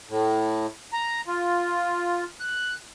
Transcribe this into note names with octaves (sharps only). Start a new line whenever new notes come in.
A2
A#5
F4
F#6